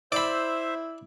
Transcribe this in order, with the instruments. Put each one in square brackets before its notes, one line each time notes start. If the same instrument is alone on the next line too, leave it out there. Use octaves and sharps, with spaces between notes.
[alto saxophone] E4 [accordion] C5 E5 [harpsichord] D5 B5